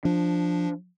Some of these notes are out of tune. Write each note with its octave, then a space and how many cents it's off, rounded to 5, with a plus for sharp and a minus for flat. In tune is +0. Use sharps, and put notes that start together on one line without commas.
F3 +0 D4 +0